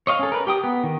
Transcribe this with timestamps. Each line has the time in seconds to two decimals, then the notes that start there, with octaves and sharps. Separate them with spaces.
0.07 C#5 D#5 F5
0.19 C#4 A4
0.32 A#4 B4
0.47 G4 G5 D#6
0.64 B3
0.83 D#3